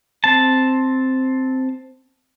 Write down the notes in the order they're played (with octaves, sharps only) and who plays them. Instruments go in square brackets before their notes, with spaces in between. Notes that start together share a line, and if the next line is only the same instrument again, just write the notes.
[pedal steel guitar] C4 A5